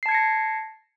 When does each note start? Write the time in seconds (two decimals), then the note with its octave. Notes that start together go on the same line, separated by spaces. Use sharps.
0.03 C7
0.06 A5
0.09 G#6
0.12 C#7
0.15 A#6